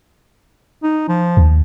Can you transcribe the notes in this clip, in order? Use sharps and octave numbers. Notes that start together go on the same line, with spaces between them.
D#4
F3
D#2